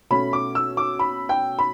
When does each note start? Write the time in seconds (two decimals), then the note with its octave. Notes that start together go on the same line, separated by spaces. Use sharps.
0.10 B2 A3 C#4 B5
0.33 D6
0.55 E6
0.77 D6
0.99 B5
1.29 G5
1.59 B5